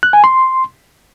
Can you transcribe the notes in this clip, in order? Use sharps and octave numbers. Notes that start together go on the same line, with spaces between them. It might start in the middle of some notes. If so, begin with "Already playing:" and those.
F#6
G#5
C6